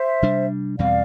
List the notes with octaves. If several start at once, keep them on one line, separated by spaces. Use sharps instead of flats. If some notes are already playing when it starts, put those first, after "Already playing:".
Already playing: C5 E5
C3 G3 D4
E2 B2 G3 C4 D5 F5